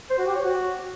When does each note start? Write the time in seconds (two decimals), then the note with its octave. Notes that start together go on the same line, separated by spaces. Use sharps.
0.10 C5
0.18 F#4
0.27 G4
0.35 C#5
0.43 F#4